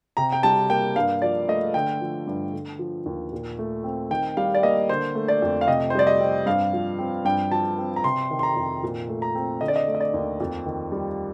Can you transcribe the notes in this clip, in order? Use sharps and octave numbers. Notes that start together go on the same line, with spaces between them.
C3 A#5
G5
G3 A5
A#3 G5
G2 F5
F3 D5
A3 D#5
D3 G5
F3
G2
D3
F3
D#2
A#2
A3
C4
D#3 G5
G3 F5
D5
A#3 D#5
D3 C5
A3
D5
F2
F5
C3 D#5
C5
G3 D5
D#5
C4
G2 F5
F3
C4
G2 G5
F3 A5
C4
A#5
C3 C6
D#3
C6
A#5
F2
A#2
A3
A#5
C4
D3 D#5
D5
D#5
A3
D#5
D5
D#2
F2
D#3
G3